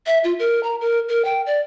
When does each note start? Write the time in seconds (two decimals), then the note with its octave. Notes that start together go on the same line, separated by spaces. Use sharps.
0.06 E5
0.24 F4
0.39 A#4
0.63 A#5
0.81 A#4
1.09 A#4
1.25 G5
1.46 D5